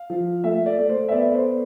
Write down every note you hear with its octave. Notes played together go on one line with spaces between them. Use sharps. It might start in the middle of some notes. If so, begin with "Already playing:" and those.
Already playing: F5
F3
A3 E5
D5
A3
C5
E5
B3 D5
C5